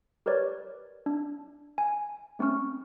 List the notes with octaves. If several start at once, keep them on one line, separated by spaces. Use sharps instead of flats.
G4 A#4 B4 C#5 D5
D4
G#5
A3 C4 C#4 C#6 F6